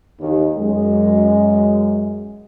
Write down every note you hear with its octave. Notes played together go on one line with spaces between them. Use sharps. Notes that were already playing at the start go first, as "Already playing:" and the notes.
D#2
F#2 G#3